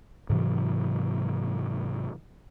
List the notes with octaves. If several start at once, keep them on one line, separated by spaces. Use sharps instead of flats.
G#2 C3 E3 F#3